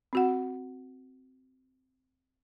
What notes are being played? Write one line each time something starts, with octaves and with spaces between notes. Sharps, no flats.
C4 F#4 F#5